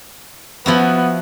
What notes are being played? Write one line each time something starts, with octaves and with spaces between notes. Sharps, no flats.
F3 B3 E4 F#4